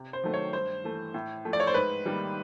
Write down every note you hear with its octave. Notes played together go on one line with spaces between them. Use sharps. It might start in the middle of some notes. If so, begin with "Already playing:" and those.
Already playing: C3
C5
D#3 F#3 A3
C#5
G2 C5
E3 A3
A2
F3 A3
D5
C#5
C5
G#2 B4
D#3 G3 A#3